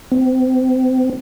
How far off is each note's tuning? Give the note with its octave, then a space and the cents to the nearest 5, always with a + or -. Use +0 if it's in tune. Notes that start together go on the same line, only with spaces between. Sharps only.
C4 -30